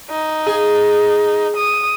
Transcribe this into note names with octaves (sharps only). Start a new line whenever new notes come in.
D#4
G#4
D#6